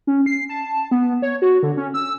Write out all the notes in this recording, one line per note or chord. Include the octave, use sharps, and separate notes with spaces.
C#4
C7
A5
B3
C#5
F#4
D3
C#4
E6